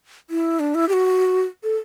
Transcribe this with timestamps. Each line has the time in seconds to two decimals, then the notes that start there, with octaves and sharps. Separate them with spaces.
0.30 E4
0.60 D4
0.75 E4
0.89 G4
0.93 F#4
1.63 A4